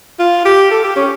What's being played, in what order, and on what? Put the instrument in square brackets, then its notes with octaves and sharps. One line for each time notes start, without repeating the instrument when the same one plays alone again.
[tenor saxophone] F4
G4
A4
G4
C#4